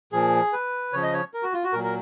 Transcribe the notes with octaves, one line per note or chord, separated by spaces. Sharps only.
A#2 F3 G#4
B4
C#3 F3 C#5
D#5
C#5
A#4
F#4
F4
F#4
A#2 F#3 A#4
A#4